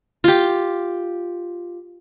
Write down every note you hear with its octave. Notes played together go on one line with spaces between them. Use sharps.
F4 G4